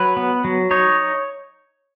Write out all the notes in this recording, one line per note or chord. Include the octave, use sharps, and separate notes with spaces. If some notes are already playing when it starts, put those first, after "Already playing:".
Already playing: F#3 B4
B3
F#3
D#4 C#5